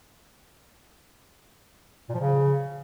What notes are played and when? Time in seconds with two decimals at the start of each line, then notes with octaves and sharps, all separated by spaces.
2.09 A#2
2.15 F3
2.20 C#3